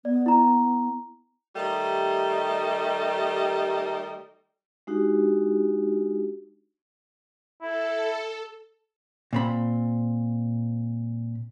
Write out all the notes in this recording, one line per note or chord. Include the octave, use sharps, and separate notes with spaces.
B3 D5
E4 A#5
D#3 G3 A3 G4 D#5
G#3 D4 D#4 F#4 G4
E4 A4
A#2 C4 B5